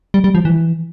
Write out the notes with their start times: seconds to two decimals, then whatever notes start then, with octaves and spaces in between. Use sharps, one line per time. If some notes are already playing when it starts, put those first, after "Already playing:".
0.14 G3
0.24 G3
0.35 F3
0.45 E3